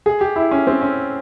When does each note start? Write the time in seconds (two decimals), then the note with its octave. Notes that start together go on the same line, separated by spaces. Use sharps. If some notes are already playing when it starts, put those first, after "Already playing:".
0.06 G#4
0.21 G4
0.36 E4
0.51 C#4
0.67 C4
0.81 C#4